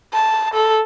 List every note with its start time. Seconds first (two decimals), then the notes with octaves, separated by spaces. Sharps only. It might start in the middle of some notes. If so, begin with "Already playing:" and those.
0.13 A5
0.54 A4